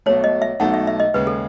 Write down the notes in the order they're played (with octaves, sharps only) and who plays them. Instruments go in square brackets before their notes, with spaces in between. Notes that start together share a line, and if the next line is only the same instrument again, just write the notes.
[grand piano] B1 B2 A3 [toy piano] C#5
[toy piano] D#5
E5
[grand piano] B1 B2 A3 D#4 [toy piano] F#5
[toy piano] E5
E5
D#5
[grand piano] D#2 C#3 G#3 [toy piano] B4
[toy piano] A4